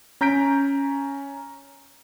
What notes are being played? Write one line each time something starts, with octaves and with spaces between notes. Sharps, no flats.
C#4 A#5 G6 B6 D7